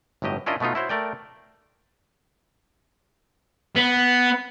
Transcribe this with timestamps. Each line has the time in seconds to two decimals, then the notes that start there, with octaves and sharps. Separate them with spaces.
0.22 G1 A2 F#3 G4 D#5
0.46 C#4 D4 E4 F4 A#4 D#5
0.60 B2 A3 B3 D#4 F4
0.75 E4 F#4 C5 C#5
0.89 A3 A#4 D5 G5
3.76 B3